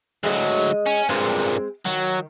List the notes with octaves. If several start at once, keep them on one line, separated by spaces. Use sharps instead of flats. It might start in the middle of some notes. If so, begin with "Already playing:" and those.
D2 F#3 G#3 D#5
C#4
G2 A#2 G#3 C4
D#3 F#3